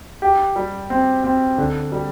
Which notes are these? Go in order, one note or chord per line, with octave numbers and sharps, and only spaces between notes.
G4
G3
C4
C4
D3
G3